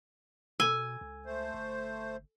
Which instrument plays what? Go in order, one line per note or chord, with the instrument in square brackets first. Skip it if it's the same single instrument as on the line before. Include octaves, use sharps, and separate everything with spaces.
[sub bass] B2 [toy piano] A4 B5 E6 [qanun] G#5
[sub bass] C#2
[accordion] A3 C5
[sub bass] G1